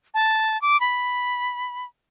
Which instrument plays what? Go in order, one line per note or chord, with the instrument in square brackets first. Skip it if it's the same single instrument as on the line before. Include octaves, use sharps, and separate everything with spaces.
[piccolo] A5
D6
B5